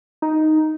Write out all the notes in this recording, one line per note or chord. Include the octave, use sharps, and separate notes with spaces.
D#4